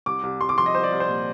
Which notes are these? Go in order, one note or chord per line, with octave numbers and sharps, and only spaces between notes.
C2 D6
C2
C2 C6
D6
F3 C6
D#5
C2 C5
D5
C2
C5
A#2